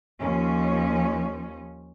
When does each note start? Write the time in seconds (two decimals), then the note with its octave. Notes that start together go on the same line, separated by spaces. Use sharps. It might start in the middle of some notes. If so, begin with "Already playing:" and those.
0.19 D#2 F3 C#4